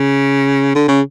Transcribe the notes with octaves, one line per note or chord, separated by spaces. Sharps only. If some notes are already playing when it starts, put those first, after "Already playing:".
Already playing: C#3
D3
C#3